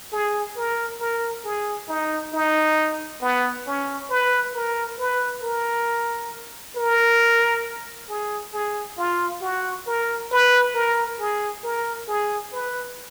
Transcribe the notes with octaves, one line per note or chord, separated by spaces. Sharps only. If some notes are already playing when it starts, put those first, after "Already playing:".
G#4
A#4
A#4
G#4
D#4
D#4
B3
C#4
B4
A#4
B4
A#4
A#4
G#4
G#4
F4
F#4
A#4
B4
A#4
G#4
A#4
G#4
B4